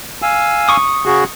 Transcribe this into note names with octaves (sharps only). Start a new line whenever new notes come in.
F5 G#5 E6
C#6 D#6
C#3 F#4 G#4